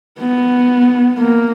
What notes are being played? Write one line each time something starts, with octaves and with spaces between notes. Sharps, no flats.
B3
A#3